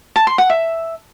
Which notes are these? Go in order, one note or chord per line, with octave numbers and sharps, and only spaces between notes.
A5
C6
F#5
E5